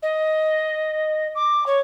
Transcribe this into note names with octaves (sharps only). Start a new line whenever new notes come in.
D#5
D6
C#5